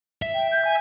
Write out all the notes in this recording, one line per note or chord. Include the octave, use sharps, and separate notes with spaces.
E5
G5
G6
G#5